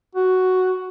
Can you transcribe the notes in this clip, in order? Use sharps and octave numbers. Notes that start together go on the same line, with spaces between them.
F#4